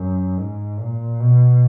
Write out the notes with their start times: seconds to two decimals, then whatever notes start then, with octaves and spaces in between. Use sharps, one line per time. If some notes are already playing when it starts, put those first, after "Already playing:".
Already playing: F#2
0.38 G#2
0.79 A#2
1.20 B2